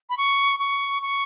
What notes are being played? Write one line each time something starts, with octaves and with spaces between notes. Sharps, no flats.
B5
C#6
C#6
C#6